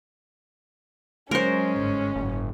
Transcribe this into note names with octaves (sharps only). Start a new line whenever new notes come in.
F#3 G#3 C#4 A#4 C5
G1 G#2
F#1 G#2